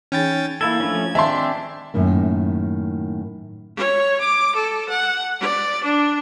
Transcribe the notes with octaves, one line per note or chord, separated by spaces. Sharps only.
E3 C#4 D#4 G#4 G5 A6
A#3 E4 A4 G#6
F3 A3 C#4 D4
D#3 G#3 C4 D4 E5 F5 A5 C6
F#2 A2 D#3 A#3
C#5
D6
A4
F#5
D5
D4